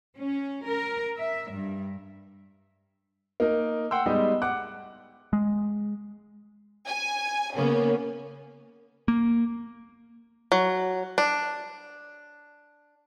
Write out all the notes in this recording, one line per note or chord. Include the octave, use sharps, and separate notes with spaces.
C#4
A#4
E5
G2
A#3 D#4 A#4
F#5 G5 C6 E6
G3 G#3 B3 D#4 G4 D#5
F#5 D6 F#6
G#3
G#5
C#3 A#3 B3 C#4
A#3
F#3
D4